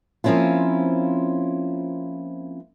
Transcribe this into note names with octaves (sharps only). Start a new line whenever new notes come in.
F3 A#3 C4 C#4 E4 F4